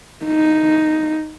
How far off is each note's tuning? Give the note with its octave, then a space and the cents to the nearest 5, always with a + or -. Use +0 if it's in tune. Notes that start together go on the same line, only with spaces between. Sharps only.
D#4 +0